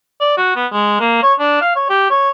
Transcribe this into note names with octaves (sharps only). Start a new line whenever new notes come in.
D5
F#4
B3
G#3
A#3
C#5
D4
F5
C#5
G4
C#5